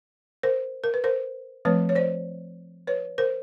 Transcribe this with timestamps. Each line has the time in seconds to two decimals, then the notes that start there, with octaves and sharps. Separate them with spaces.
0.43 A#4 C5
0.84 A#4
0.94 B4
1.04 A#4 C5
1.65 F3 A3 C4 B4 C#5
1.89 C#5
1.95 C5 D5
2.87 B4 C#5
3.18 A#4 C5